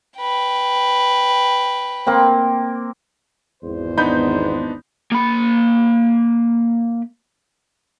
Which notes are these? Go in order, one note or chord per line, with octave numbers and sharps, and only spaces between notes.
B4 G5
A#3 C4
G#1 E2 C5
B3 D4 D#4 B5 G6
A#3 B5